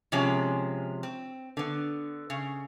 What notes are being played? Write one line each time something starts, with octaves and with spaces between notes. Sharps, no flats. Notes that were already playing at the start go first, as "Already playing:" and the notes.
C3 F3 G#3 C#4
C4
D3 B3
C#3